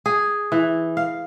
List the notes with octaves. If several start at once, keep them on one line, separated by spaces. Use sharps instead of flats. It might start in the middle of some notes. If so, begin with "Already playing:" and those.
G#4
E3
F5